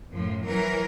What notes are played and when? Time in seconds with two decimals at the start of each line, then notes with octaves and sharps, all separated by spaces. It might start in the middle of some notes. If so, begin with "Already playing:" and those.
0.12 F#2 A2 F3
0.46 E3 F#3 A#4